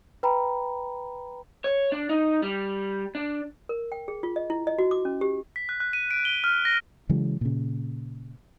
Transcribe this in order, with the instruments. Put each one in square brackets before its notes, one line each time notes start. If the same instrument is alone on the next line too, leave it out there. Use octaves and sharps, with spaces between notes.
[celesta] B4 G5 A#5 B5
[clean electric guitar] C#5
D4
D#4
G3
D4
[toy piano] A#4
G5
G#4
F4
D#5
E4
D#5
F#4
D6
C#4
G4
[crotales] B6
F#6
F#6
D#7
D7
G7
F6
A#6
[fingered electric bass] C#3 E3 F#3 G#3
A#2 C#3